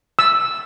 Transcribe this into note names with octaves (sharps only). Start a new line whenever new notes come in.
E6